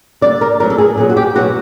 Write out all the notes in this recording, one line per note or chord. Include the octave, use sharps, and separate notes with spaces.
D3 G3 A#3 D5
A#4
A2 F#3 B3 A#4
A4
G#4
A#2 F#3 B3 G#4
F#4
G4
B2 F#3 B3 F#4